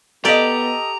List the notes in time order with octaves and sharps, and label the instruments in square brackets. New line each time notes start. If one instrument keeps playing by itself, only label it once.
[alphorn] B3 [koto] G4 D5 [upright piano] A4 D#5 [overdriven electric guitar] A#5